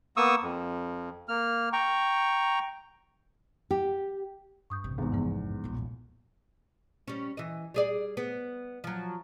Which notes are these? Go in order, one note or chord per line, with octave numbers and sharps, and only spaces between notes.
A#3 B3 C#6 D#6 E6
F2
A#3 F6
G5 A#5 C#6
G4
G2 C#6 D#6 G6
A1 C3
E2 G#2
G2 E3 F3 B3
D#1 B1 A#2
G3 C#4
E3 D#5
G3 G#4 D5
B3
F3 F#3